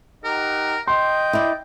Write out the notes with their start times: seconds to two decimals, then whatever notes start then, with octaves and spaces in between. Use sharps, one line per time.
0.24 D#4 G4 A#4 F#5
0.88 D#5 G5 C6
1.33 E4 D5